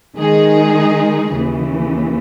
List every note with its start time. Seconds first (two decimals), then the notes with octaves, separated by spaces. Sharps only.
0.16 D#3 G#3 D#4 G#4
1.33 D#2 C#3 E3